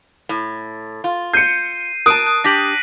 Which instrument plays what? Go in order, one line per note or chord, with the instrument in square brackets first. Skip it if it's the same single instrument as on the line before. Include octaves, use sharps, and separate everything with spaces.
[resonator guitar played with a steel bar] A2
F4
[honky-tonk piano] G6 C#7 [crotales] C7 D#7
[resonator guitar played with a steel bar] A#4 A5 [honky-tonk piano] D#6 [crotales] F#6 D7 D#7
[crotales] F#6
[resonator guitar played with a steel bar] D4 G4 [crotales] A#6 B6 F#7